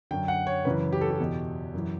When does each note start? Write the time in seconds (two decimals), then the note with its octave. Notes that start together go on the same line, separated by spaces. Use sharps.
0.11 F#2 D3 G5
0.28 F#5
0.47 C#5
0.65 F#2 C#3 E3 B4
0.92 G4
1.01 A4
1.10 G4
1.20 E2 B2
1.74 F#2 E3